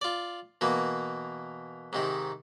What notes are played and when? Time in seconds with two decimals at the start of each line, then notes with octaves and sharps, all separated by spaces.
0.01 F4 D5
0.61 B2 E3 A#3
1.93 G#2 C3 D#3